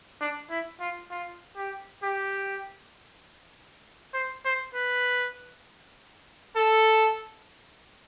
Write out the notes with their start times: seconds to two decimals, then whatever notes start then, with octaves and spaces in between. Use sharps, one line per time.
0.21 D4
0.50 E4
0.80 F4
1.11 F4
1.57 G4
2.03 G4
4.14 C5
4.45 C5
4.74 B4
6.56 A4